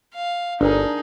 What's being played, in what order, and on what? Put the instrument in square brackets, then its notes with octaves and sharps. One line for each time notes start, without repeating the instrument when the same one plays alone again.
[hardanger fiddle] F5
[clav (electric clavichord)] G1 [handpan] D4 A#4 [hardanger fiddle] D#4 G#4